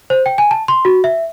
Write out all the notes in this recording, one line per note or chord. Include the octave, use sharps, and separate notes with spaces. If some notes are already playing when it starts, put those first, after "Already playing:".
C5
G5
G#5
A5
C6
F#4
E5